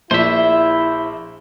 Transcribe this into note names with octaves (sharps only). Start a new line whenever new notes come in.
A#1 E4 C5 E5